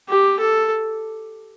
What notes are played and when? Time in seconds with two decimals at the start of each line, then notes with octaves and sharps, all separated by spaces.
0.09 G4
0.39 A4